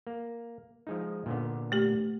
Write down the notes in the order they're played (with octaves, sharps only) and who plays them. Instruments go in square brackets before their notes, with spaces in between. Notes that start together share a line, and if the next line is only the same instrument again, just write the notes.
[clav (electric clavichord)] A#3
F3 G#3 D#4
A#2 D3 B3
[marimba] A3 G4